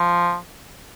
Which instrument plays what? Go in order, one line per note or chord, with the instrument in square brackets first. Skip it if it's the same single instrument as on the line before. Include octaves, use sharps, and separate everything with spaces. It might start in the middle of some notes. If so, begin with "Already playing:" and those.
Already playing: [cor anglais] F3